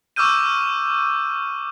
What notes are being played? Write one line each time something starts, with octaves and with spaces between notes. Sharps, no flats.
C#6 D6 E6 F6 G6 D#7